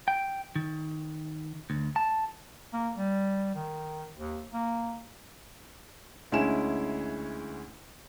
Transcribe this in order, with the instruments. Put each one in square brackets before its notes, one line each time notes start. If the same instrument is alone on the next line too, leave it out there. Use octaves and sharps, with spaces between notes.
[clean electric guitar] G5
D#3
D2
A5
[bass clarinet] A#3
G3
D#3
D#2
A#3
[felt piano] D2 G#3 C#4 E4 G#5 E7